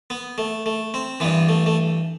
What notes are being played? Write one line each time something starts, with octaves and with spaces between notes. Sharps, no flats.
B3
A3
A3
C4
G2 E3 B3
A3
A3